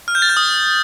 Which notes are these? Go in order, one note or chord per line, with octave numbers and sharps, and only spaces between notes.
F6
G6
A6
G6
D#6